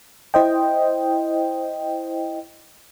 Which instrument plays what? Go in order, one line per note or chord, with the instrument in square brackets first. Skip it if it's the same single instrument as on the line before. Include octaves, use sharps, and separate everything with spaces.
[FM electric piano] E4 C5 D#5 G5